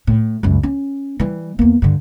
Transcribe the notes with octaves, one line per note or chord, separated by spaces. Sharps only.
A2
C#2 F#2
C#4
E3 G3
E2 A#3
G2 D3